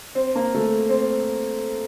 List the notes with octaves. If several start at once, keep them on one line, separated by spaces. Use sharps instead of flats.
C4
A#3
A3
C4